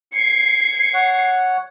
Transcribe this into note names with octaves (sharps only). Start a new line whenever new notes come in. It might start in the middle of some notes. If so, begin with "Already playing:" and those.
G#6 C7 C#7
C#5 F#5